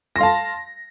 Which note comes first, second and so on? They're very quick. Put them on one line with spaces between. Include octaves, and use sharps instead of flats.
A#6 C6 F5 A5